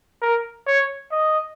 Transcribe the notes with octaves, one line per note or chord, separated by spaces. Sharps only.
A#4
C#5
D#5